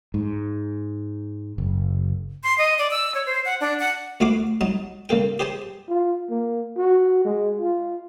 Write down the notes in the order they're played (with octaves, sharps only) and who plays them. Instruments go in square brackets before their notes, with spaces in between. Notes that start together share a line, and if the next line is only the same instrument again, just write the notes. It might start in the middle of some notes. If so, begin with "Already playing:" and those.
[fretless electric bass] G#2
F#1
[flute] C6
D#5
D5
E6
C#5
C5
F#5
D4
F#5
[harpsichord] D2 A3 E4 F#4 F5 D6
F#3 D#4 A5
C#3 A#3 A4 G5
G4 G#4 C5 G#5 A5
[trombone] F4
A#3
F#4
G#3
F4